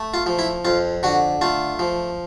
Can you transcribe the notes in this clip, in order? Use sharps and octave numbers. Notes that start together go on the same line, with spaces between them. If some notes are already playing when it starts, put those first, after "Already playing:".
Already playing: A3
F4
F3
E4
F2 F4
D3 F#4
A3 F4
F3